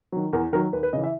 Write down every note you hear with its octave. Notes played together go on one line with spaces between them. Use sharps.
D#3 F#3
E2 A#4
D#3 F#3 A#4
D#2 B4
B4
C#3 E3 D#5
E5